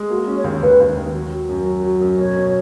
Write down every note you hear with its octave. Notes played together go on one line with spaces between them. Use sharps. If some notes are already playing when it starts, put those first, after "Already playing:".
Already playing: G#3
A#3 F#4
C#4
C#5
D#2
D#2 B4
D#2
D#2
F#3
F#3
F#2
F#3
F#3
F#2
B2 C#5
B2